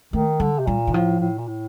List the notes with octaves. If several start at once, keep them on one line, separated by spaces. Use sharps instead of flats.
D#3 A3
D3 G3
C3
A#2 G3
D#3
A2 F3
A2
A#2
A2